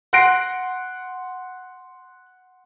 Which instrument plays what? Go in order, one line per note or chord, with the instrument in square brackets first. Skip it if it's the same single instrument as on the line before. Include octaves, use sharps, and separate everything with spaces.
[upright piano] F#5 C6 F#6 A#6 C7 D7